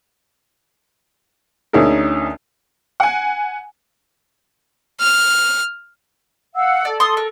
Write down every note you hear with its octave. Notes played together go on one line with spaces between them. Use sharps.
D2 C#4 D#4 G#4 A#4
F#5 G#5
F6
F5 F#5 E6
A4 D5
C6 D#6
A#4